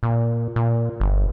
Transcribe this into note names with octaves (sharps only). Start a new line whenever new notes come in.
A#2
A#2
G1